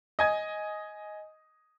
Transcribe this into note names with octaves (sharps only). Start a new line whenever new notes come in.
D#5 G#5 G#6